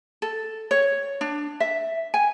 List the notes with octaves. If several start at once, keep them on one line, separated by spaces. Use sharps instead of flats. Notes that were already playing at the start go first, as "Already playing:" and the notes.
A4
C#5
D4
E5
G#5